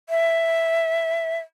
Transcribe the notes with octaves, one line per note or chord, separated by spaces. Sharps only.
E5